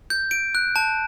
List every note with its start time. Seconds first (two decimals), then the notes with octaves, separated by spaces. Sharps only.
0.10 G6
0.31 D7
0.55 F#6
0.76 A5